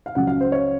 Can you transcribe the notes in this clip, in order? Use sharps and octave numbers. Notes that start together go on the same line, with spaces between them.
F5
C#2 C#3 F#3 F#5
F5
C5
C#5